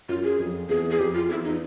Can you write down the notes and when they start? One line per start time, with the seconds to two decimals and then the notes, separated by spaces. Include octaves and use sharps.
0.09 F#2 F4
0.24 G#4
0.39 F2
0.69 E2 G#4
0.91 G#4
0.99 F2 G4
1.14 F4
1.30 E2 E4
1.44 D#4